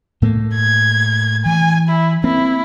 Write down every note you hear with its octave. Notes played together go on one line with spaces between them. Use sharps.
A2 A3 A#3
G#6
E3 G#5
E4
A#3 C4 E4